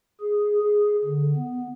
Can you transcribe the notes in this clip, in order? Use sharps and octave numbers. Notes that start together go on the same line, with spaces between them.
G#4
G#4
D3
B3